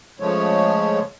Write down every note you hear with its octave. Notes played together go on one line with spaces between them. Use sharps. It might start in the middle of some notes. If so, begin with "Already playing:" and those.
C#3 F3 G#3 A3 C#5